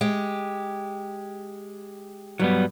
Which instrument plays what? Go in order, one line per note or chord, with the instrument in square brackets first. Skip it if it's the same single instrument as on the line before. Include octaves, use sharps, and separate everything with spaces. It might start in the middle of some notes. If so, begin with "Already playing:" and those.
[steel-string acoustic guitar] G#3 G4
[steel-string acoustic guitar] G2 [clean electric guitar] F#3 G3 B3